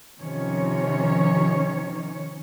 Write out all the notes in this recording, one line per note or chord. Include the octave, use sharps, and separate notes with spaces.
C3 D#3 F3 C#4 C#5